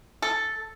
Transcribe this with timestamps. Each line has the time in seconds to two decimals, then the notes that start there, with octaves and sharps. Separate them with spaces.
0.22 A4